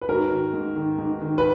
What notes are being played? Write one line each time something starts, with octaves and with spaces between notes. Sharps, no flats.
B4
G#2 F#4 A#4
D#3
G#2
D#3
G#2
D#3
B4